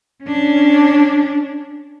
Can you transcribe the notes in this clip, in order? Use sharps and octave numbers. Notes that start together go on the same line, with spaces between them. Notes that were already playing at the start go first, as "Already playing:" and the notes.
C#4 D4